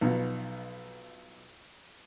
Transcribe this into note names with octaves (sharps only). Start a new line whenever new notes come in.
B1 B2 F3